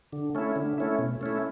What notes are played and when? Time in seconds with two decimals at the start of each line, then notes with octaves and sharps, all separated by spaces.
0.13 D3
0.35 A3 C#4 E4
0.56 D3
0.78 A3 C#4 E4
0.99 B2
1.21 A3 C#4 E4